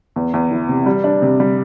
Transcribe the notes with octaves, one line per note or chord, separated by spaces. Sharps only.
E2
E2
E3
C3
G3
D4
C3
G3